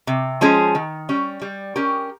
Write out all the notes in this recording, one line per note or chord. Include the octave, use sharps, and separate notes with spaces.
C3
F3 G#3 C#4 G#4
D#3
G3 C#4
G3
C#4 G4 A#4